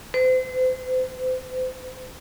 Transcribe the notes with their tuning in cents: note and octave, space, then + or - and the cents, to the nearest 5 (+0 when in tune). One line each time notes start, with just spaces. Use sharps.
C5 -35